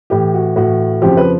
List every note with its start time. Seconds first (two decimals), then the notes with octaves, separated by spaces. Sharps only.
0.10 A2 E3 G4
0.34 F#4
0.56 A2 E3 F#4
1.02 F2 C#3 F3 G4
1.17 B4